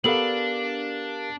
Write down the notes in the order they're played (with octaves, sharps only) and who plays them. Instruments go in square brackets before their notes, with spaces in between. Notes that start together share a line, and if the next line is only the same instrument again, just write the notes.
[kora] B3 A4 D5 [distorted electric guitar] D4 [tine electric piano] G4 A#4 F5 [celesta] F#7